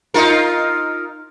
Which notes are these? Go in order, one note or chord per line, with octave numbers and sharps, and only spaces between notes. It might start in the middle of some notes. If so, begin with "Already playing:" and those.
D#4 F4 A#4